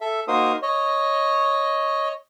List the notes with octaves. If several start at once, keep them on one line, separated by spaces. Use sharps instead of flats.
A4 E5
A#3 D#4 F#4 A#4 C5 D#6
C#5 D#5